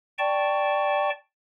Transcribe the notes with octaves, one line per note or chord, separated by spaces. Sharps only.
D5 G5 A5 C#6